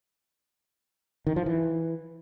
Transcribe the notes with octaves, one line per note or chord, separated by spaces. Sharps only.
D#3
F3
E3